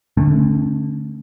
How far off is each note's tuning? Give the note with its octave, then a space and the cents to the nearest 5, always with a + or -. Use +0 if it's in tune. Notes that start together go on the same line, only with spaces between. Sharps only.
D3 +0 A3 -15 C#4 -40